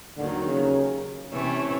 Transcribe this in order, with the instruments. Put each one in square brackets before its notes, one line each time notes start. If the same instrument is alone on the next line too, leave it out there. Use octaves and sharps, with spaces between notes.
[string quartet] D#2 D#3 F#3 [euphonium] D3
[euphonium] C#3
[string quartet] C3 E3 A3 C#4